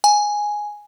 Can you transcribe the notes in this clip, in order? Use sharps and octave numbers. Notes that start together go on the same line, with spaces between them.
G#5